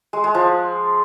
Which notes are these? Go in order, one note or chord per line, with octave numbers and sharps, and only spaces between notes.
G#3
G#3
F3